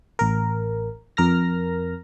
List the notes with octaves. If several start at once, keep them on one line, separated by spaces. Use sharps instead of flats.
A1 A#4
F2 A#4 F6 A#6